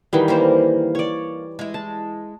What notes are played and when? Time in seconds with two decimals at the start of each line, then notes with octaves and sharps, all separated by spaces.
0.13 D#3 E3 G3 F#4 G#4
0.28 A#3 G4 C5
0.95 C#5 D5
1.59 G#3 E4
1.74 A5